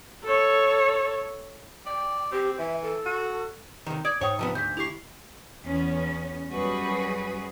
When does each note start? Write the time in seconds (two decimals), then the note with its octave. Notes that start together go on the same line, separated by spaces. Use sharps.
0.24 A4 C#5
1.86 D5 G5
2.32 C4 G4
2.59 E3 E5
2.82 A4
3.06 F#4
3.87 C3 D#3
4.05 D5 D#6 G#6
4.21 G#2 C5 C#5 G5 D#6
4.39 C3 F3 B3
4.55 D2 G6 B6
4.77 E4 G4 C#6 C7 F7
5.65 E2 B3 C#4
6.51 F#2 G3 F#4 G#4 B4